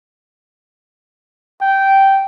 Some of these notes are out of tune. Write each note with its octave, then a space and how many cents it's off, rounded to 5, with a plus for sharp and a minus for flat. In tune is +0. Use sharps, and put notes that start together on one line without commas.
G5 -10